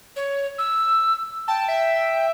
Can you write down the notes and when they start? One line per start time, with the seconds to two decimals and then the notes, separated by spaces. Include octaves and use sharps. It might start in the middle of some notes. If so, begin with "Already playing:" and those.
0.16 C#5
0.58 E6
1.48 G5 A5
1.68 E5